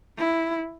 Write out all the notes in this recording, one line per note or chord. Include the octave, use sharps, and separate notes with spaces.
E4